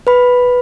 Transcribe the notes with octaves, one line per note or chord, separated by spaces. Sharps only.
B4 B5